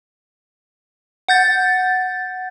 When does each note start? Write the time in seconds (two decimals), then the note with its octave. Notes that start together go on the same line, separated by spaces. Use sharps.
1.28 F#5 G6 A6